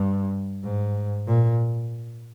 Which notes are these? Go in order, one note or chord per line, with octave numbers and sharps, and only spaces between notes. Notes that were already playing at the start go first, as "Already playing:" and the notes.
Already playing: G2
G#2
A#2